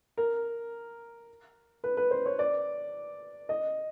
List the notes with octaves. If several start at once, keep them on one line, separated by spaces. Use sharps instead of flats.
A#4
B4
B4
C5
C#5
D5
D#5